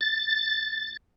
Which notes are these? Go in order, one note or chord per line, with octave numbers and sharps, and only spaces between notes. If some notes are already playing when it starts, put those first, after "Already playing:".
A6